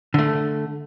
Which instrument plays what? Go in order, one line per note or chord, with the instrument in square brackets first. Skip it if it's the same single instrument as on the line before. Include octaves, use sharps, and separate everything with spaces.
[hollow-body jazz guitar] D3 A3